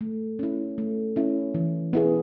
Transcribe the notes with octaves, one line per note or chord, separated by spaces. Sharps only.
A3
C#4 E4
A3
C#4 E4
E3
B3 E4 G#4